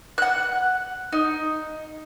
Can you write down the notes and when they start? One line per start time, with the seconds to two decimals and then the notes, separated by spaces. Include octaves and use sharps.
0.18 F#5 F#6
1.12 D#4